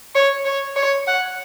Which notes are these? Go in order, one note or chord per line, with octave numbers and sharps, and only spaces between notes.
C#5
C#5
C#5
F#5